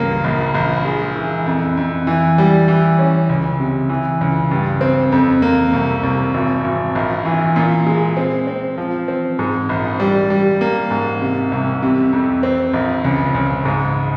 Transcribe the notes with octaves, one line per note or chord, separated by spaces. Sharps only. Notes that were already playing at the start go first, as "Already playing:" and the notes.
Already playing: C#2 G2 A#3
A#1
A#1
G#3
E3
F2
F2
E3
G3
E3
C#4
C#2
C3
E3
C#2
G2
C4
F2
A#3
C2
C2
G#1
G#1
A#1
E3
A#2
G#3
C4
C4
F3
C4
G#2
A#1
G3
G3
A#3
G#2
C3
C2
C3
F2
C4
A#1
C#2
C#2
G#2